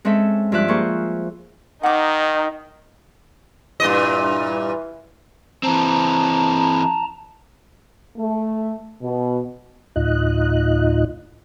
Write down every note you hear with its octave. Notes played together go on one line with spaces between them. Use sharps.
G#3 C4 C#4 A4 E5
G2 F3 F4 E5 D6 F#6
A#3 G#4 C5 C#6
D#3 D#4 F#5 D6
G2 A#2 E3 D#5
E3 C4 A5 A#5
A3
B2
D2 A2 D#4 F4 D#5 F#6